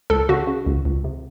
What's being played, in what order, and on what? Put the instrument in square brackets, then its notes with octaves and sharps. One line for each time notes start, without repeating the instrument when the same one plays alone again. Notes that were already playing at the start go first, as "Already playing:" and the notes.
[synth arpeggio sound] C#2 A4
C#3 F#4
C#3
C#2
C#2
C3